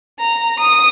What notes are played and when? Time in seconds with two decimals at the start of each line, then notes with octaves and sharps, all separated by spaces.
0.19 A#5
0.59 D#6